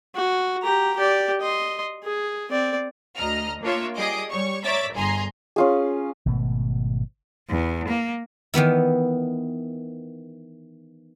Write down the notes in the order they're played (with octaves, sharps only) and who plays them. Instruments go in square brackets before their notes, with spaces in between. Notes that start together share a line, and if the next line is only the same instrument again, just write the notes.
[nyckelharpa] F#4
G4 A#5
G4 D5
D#5 C6
G#4
C4 D5
[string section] D2 D#5 A#5 F6
A#3 D4 F4 C#5 E5
G3 G#4 D#5 D6 D#6 C7
G3 C#5 C#6
C#5 D5 E5 A#5 A6 B6
G1 G#4 G#5 A#5 C6
[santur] C#4 F4 G#4
[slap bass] G#1 B2 A3
[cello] E2
A#3
[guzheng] D#3 E3 B3 E4